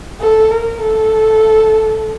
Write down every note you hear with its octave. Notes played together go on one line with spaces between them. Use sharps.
A4
A#4
A4